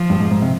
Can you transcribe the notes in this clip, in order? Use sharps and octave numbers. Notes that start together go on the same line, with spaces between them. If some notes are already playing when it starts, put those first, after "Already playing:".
Already playing: F3
G2
G#2
G#2
C3